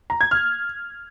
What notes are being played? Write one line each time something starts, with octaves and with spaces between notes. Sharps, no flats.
A#5
G#6
F6